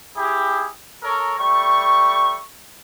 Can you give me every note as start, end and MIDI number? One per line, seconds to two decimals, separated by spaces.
0.17 0.68 64
0.17 0.68 67
0.17 0.68 68
1.02 1.36 69
1.02 1.36 70
1.02 1.36 73
1.02 1.36 82
1.38 2.39 55
1.38 2.39 57
1.38 2.39 85